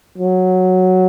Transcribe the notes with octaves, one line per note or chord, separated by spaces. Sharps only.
F#3